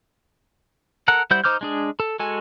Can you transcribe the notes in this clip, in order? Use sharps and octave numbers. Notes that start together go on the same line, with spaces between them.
A4 A#4 F#5
G3 E4 C5 F#5 G6
D#4 C5 D6 F6 G6
G#3 D4 G#4
A4
G#3 F#4 A4 G#5